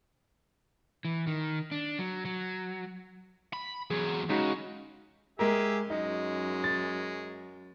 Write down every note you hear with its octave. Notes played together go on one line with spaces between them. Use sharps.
E3
D#3
D4
F#3
F#3
B5
E2 F#3 G#4
C#3 G#3 D#4 F#4
G#3 G4 G#4 A#4 E5
F#2 G#3 D#4
A6